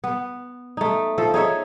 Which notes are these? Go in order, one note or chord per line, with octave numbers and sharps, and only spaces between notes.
B3
A3 D#4
F3 A4
D#4 G#4 C#5 E5